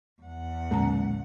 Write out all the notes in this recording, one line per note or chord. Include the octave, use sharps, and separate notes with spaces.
E2 F#5
B1 A#2 D3 G#3 C#4 A#5